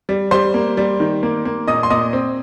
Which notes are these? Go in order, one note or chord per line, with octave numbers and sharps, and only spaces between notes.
G3
G3 C5 C6
A#3
G3
D#3
A#3
A#3
A#2 D#5 D#6
C6
A#2 D#5 D#6
C4